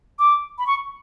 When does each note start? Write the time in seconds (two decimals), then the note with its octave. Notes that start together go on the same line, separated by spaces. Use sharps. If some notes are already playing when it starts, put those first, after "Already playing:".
0.19 D6
0.58 B5
0.67 C#6